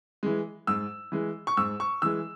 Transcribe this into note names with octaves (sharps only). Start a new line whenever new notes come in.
E3 G#3
G#2 E6
E3 G#3
C#6
G#2 E6
C#6
E3 G#3 E6